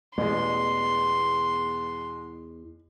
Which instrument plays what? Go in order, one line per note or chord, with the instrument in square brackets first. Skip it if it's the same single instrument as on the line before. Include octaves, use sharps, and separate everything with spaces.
[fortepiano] A1 [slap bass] E2 [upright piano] B2 G#3 [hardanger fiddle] C6